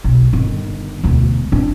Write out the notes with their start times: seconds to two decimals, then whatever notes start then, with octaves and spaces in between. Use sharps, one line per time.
0.04 B1
0.33 G1 D#3
1.04 E1 D2
1.52 D4